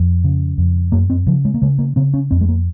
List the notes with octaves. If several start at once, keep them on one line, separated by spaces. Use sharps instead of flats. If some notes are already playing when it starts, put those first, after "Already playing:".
Already playing: F2
C#3
F2
F#2 A#3
C4
C#3 F3
G#3
A#3
C#3 G#3
A#3
C#3 C4
C#4
F2 C4
G#3
A#3